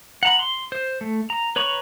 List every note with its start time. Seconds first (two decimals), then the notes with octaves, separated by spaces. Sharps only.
0.23 F#5 A#5 B5
0.39 C6
0.72 C5
1.01 A3
1.30 A#5
1.56 B4 C#5 A#5 B5 C#6